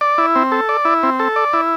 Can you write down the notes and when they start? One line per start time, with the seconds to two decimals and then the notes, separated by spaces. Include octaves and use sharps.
0.01 D5
0.18 E4
0.36 C4
0.52 A4
0.69 D5
0.85 E4
1.03 C4
1.19 A4
1.36 D5
1.53 E4